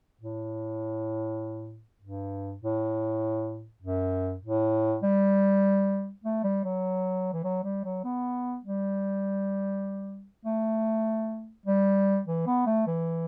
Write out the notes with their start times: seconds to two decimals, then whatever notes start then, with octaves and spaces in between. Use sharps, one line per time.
0.21 A2
2.02 G2
2.62 A2
3.83 F#2
4.43 A2
5.03 G3
6.24 A3
6.44 G3
6.64 F#3
7.33 E3
7.44 F#3
7.64 G3
7.85 F#3
8.04 B3
8.65 G3
10.45 A3
11.66 G3
12.27 E3
12.47 B3
12.66 A3
12.87 E3